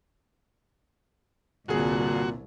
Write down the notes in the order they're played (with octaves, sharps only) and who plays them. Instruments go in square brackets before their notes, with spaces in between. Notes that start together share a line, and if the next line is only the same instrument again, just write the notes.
[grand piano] G1 G#4 [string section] C2 [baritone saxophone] A#2 [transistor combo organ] F#4